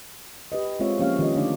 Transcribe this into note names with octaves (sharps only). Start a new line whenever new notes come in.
G4 B4 D#5
G#3 C4 F4 C#5 E5
F3 A#3 C#4 G4 C#5 F5
D#3 F3 F4 G4 B4 D#5
D3 D#3 A3 D4 D#4 D5